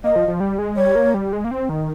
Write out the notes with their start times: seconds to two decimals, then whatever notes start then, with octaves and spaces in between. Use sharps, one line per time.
0.04 A#3 D#5
0.16 F3
0.28 F3
0.40 G3
0.59 G#3
0.77 G3 C#5
0.96 A#3
1.14 G3
1.33 G#3
1.44 A#3
1.51 C4
1.69 D#3